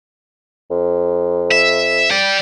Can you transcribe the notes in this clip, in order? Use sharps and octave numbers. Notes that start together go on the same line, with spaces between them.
F2
E5
D5 G5